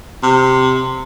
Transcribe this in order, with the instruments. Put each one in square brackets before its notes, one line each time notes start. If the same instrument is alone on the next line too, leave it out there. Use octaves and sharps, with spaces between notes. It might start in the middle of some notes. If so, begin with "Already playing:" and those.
[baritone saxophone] C3